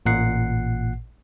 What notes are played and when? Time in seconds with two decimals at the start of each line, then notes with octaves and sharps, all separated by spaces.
0.06 A1 A#2 F#5 C7